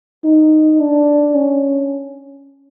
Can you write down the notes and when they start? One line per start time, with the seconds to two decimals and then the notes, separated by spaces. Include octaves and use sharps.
0.24 D#4
0.80 D4
1.35 C#4